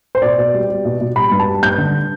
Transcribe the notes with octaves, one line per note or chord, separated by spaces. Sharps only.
C5
B2 D5
B2
G3
G3
B2
B2
G3 B5
G2
A5
G3
G2 G6
D3